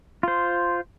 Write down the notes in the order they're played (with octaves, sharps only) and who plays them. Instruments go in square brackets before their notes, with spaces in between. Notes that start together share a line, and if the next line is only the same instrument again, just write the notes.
[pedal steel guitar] F4 C5